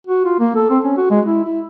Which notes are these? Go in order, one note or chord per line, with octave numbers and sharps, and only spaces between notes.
F#4
F4
A#3
A4
C4
C#4
F#4
G#3
E4
E4